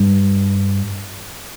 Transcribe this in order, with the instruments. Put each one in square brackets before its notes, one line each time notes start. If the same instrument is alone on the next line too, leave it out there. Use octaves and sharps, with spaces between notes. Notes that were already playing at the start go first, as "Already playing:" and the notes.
Already playing: [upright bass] G2